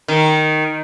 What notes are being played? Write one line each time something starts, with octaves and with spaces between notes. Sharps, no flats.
D#3